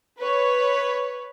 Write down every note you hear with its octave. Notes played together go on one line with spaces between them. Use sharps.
B4 C#5